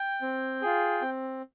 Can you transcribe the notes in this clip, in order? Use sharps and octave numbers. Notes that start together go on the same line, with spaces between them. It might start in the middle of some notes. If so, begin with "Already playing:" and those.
Already playing: G5
C4
F4 G#4
C4